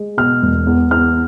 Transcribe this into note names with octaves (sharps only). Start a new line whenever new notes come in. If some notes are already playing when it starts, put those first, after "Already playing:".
Already playing: G#3
B2 F6
E1
E2
E2 F6